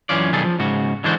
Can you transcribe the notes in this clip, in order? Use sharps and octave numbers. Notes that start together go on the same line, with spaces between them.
F#2 E3 C#4 F4 D5
B1 D#3 G3 G#4 A4
F3
G#2 C#3 F#4
D3 E3 G#3 D4 F#4 C5